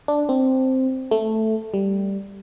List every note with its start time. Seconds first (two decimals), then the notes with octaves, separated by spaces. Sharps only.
0.08 D4
0.29 C4
1.11 A3
1.74 G3